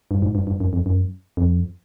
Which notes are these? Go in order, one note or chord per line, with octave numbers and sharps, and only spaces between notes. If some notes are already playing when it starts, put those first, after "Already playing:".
G2
G#2
G2
G2
F#2
F2
F#2
F2